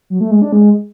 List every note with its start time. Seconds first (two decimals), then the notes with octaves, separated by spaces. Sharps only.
0.10 F#3
0.21 A3
0.31 G#3
0.42 D4
0.52 G#3